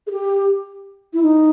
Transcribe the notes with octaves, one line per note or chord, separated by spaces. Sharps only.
G#4
G4
E4
D#4